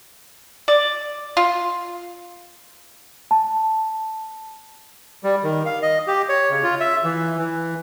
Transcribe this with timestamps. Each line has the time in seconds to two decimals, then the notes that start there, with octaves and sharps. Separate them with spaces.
0.68 D5
1.37 F4
3.31 A5
5.23 G3
5.43 D#3
5.66 F5
5.82 D#5
6.08 G4
6.29 C#5
6.51 C#3
6.63 F4
6.80 E5
7.04 E3
7.38 E3